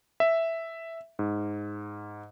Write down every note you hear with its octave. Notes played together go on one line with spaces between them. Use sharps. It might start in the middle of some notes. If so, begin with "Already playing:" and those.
E5
G#2